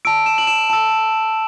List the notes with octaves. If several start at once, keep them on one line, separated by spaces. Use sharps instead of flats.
A5 E6 D7
E7
F#7
E7
A5 E6